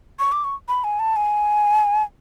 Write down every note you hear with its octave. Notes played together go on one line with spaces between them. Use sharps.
C#6
D6
C#6
B5
G#5
A5
G#5